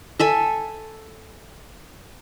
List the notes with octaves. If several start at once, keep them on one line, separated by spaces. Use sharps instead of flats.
A4 E5 G#5